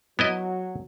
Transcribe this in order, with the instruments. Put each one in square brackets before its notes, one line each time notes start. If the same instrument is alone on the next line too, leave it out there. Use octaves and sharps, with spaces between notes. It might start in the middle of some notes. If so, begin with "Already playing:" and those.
[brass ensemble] F#3 [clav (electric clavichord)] B3 E4 D#5